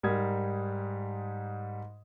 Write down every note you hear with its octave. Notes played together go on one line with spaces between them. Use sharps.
G#2 G3 A#4 D#6 G#6